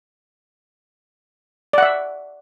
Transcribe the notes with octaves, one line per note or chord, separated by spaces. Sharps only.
D5 E5 F#5